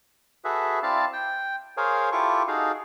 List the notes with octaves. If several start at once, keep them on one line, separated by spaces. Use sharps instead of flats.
F#4 G#4 A4 B4 E5
C4 E4 D5 F5 A5
G5
G#4 A#4 C5 C#5 F5 G#5
E4 F4 G4 A4 C#6 D6
D#4 F#4 G#4 A4 F5